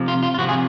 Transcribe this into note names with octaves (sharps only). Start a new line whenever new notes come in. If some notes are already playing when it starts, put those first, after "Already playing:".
Already playing: C3 F3
F4
F4
F4
C3 F3 F#4
G#4